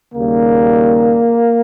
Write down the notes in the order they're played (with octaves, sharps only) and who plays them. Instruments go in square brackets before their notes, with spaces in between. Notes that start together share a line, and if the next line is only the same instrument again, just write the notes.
[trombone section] D#2 C#3 G3 A#3